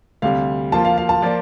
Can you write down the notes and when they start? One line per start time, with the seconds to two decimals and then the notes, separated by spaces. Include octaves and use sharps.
0.22 D2 C3 G3 F5
0.72 F3 A#3 F4 A5
0.85 F5
0.98 F5
1.09 A5
1.22 F3 A#3 F4 A#4 D5